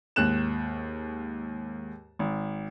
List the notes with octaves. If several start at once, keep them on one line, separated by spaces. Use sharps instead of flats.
D#2 G#2 F#6 E7
G#1